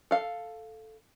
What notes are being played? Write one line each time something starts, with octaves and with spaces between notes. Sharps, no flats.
A4 F5